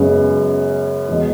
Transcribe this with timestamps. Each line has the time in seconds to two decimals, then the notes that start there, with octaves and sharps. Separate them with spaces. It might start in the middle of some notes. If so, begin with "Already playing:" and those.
Already playing: F#2 C#3 G#3 B3
1.09 E1 B2 G#3